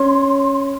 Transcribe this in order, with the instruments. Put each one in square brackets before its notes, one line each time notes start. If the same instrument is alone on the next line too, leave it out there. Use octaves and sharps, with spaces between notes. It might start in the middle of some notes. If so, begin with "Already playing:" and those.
Already playing: [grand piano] C#4 [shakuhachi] C6